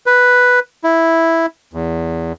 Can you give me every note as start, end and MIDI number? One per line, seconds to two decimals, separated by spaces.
0.06 0.60 71
0.84 1.46 64
1.74 2.33 40